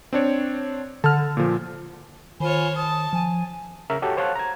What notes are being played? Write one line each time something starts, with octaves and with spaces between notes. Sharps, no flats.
C4 D4 C#5
D3 A5 F6
A#2 F3
D#3 F4 C5 C#5 G#5 B5
A5 D#6
F3 G#5
C#3 A#4 E5 A#5
F#4 G4 A4 C#5
C5 C#5 F5 F#5 A5 F#6
A#5 G#6